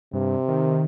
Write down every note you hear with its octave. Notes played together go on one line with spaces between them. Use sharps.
G2 C3
D#3